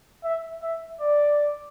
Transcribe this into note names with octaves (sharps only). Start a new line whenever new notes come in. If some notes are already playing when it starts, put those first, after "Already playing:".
E5
E5
D5